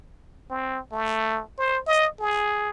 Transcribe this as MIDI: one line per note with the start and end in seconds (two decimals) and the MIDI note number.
0.50 0.80 60
0.92 1.42 57
1.58 1.80 72
1.87 2.08 75
2.20 2.70 68